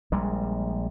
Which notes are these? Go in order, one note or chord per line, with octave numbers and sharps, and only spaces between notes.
A#1 G3 G#3